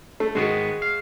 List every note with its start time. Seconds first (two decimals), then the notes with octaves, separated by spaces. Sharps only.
0.20 A3
0.35 G#2 D#3 G#3 B3 F#4
0.82 F5